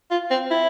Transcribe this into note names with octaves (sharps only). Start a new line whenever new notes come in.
F4
C4
E4